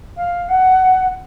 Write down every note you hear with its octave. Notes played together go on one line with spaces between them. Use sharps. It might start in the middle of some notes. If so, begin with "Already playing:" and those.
F5
F#5